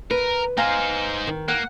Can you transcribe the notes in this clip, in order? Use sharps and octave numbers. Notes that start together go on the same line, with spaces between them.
A#4 B4
B3 D#4 C5 F5 G#5 A#5
D#3
A#3 F#5